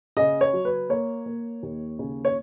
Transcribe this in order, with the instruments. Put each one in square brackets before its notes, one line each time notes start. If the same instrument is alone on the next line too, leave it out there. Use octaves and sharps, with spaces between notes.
[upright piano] C#3 D#5
C#5
F#3
B4
A#3 C#5
A#3
D#2
C#3
C#5